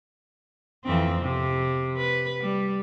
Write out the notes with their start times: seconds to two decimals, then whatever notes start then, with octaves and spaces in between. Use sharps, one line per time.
0.84 F2 E3 C4
1.21 C3
1.97 B4
2.41 G3